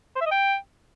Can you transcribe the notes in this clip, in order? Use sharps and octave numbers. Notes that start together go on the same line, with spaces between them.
C5
E5
D#5
G5